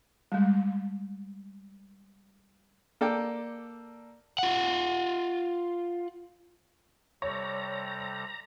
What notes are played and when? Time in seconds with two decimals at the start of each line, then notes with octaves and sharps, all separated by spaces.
0.32 G3 G#3
3.01 A#3 A4 D5 G5
4.38 F4 F#5
7.22 C3 G3 A4 C#5 A#5